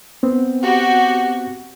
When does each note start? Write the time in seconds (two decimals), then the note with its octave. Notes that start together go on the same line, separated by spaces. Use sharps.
0.23 B3 C4
0.62 F#4 G4